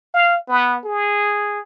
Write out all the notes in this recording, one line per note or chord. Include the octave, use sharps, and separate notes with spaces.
F5
B3
G#4